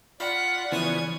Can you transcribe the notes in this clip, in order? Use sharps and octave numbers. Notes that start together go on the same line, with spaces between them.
F4 D5 F#5 B5 B6
C#3 E3 F3 B3 C#5 G#5 G#6